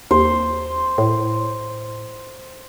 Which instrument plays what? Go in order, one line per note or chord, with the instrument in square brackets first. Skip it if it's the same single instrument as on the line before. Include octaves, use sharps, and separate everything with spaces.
[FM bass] D#2 [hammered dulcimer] C5
[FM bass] A2